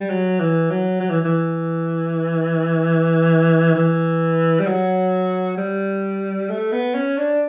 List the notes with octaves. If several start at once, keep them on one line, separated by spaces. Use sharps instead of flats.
G3
F#3
E3
F#3
F#3
E3
E3
E3
G3
F#3
G3
A3
B3
C#4
D4